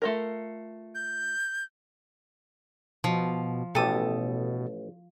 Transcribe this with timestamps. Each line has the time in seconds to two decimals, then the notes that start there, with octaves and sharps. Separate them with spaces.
0.02 A3 F4 A#4
0.95 G6
3.04 B2 F3
3.75 A1 B2 G4 A4 D#6